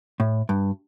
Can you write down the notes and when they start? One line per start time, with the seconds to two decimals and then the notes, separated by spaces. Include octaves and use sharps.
0.20 A2
0.49 G2